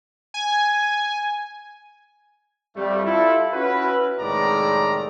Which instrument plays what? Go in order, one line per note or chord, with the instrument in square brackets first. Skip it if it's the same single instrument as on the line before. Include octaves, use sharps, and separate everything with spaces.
[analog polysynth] G#5
[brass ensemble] F2 G3 A3
E4 F4 A4
C#4 E4 F#4 B4
C2 A2 D#3 G#3 D5 A#5